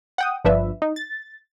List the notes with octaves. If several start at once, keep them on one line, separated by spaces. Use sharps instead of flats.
F#5 G5 D#6
G1 F3 D4 B4 E5
D#4
A6